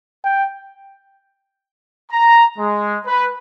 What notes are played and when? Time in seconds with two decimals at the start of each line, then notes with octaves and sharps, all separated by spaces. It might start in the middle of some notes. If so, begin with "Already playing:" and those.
0.24 G5
2.11 A#5
2.59 G#3
3.06 B4